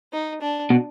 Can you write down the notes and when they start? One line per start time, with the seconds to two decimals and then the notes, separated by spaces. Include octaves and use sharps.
0.13 D#4
0.41 D4
0.70 B2